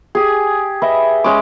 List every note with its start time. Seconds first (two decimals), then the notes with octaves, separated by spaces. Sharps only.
0.15 G4 G#4
0.82 B4 D#5 E5
1.24 G#3 C#4 B5 D6